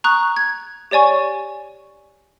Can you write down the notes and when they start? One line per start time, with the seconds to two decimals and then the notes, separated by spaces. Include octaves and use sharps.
0.04 A#5 C#6 D#6 F#6
0.36 G#6
0.91 G4 C#5 D5 G#5 C#6